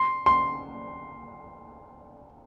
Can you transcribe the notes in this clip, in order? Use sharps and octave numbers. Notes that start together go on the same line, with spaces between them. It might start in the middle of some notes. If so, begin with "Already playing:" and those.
Already playing: C6
C6